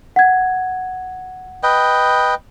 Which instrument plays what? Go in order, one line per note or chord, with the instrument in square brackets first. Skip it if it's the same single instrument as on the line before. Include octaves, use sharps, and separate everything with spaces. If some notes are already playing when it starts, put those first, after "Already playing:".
[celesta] F#5 G#6
[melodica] B4 D#5 G5